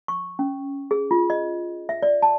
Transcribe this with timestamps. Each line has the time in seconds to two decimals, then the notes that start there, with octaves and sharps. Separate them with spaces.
0.08 C#6
0.39 C#4
0.91 G#4
1.11 F4
1.30 D#5
1.89 E5
2.02 D5
2.22 A5